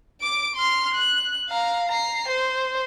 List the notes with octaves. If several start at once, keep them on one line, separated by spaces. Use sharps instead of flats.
D6 D7
C6 F6
F#6
F5 A#5
A#5 C7
C5